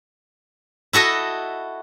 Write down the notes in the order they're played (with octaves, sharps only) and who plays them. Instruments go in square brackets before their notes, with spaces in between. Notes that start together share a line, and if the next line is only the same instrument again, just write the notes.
[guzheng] E4 F#4 A4 D#5